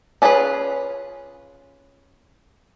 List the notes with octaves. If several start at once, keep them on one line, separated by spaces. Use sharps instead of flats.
C#4 D4 F4 G#4 B4